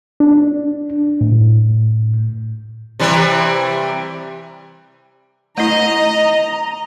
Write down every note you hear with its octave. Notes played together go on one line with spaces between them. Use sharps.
D4
A2
C3 E3 G3
A3 E4 D#5 A#5